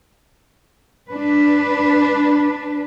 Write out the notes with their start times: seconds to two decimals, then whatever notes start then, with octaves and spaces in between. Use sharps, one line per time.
1.09 D4 B4